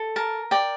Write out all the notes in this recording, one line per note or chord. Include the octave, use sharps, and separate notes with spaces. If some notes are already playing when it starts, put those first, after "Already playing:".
Already playing: A4
A#4 A5
D5 G5